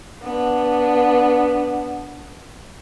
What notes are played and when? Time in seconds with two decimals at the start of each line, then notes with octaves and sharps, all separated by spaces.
0.23 B3 D4